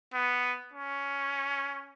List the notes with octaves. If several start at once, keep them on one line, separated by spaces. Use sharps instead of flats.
B3
C#4